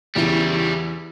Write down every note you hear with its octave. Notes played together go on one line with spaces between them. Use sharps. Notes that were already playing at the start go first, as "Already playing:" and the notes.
E2 C#3 G3 E4